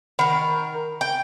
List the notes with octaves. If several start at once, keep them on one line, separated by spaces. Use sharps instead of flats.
D#3 A#4 F#5 B5
G5